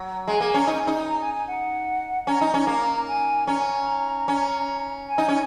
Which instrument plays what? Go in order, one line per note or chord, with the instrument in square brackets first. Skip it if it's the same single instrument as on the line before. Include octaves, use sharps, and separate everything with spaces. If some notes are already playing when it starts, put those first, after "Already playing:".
Already playing: [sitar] F#3
[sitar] G#3 [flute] G#5
[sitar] A#3
[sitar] C#4 [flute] A#5
[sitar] D#4 [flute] G#5
[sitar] D#4
[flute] G#5
A#5
G#5
G#5
F#5
[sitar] C#4 [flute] A#5
[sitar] D#4
C#4
A#3
[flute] G#5
[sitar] C#4 [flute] A#5
[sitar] C#4
[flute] G#5
[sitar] D#4
C#4